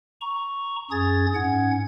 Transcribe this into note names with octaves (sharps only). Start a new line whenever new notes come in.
A#5 C#6
F#2 C#4 G#4 D#6 G#6 A6
G#2 C#4 F#5 G#6